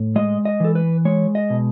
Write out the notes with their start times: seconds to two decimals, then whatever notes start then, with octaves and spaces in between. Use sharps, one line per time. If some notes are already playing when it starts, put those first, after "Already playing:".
Already playing: A2
0.16 G#3 D#5
0.45 D#5
0.60 E3 A4
0.75 B4
1.05 G#3 C#5
1.35 D#5
1.50 B2